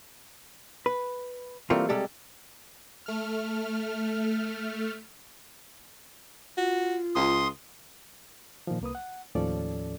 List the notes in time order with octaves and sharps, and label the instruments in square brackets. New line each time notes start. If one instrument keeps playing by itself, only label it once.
[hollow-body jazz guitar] B4
E3 G3 A3 A#3 C4 F4
C3 G3 G#3 G4 A4
[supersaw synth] A3 F6
[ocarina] F4 [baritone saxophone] F#4
[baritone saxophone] C#2 [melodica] C6 D#6
[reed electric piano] A#2 D#3 F3
C2 A#3 B4 D#6
F#5
D#2 A2 F3 C#4 A4 D5